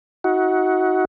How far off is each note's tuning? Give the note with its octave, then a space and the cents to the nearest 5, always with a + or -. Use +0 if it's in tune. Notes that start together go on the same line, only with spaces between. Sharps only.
D#4 +40 F#4 +0